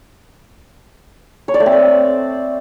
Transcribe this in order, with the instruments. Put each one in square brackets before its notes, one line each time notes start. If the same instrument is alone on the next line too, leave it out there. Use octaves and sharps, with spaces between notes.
[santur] C#5
D5
A3
C4
C5